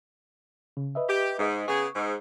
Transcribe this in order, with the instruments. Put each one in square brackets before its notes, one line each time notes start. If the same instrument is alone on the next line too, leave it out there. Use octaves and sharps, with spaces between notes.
[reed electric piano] C#3
B4 D#5 E5
[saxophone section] G4
G#2
[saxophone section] C#3 B3 G#4 [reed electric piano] C#6
[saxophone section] G#2